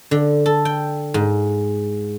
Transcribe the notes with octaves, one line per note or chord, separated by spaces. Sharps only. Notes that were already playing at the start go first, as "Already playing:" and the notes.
D3
A4
G5
G#2